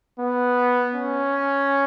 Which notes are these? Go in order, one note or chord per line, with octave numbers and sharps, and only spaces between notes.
B3
C#4